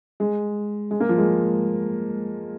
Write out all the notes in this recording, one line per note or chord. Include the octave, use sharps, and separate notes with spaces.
G#3
G#3
A#3
F3
G#3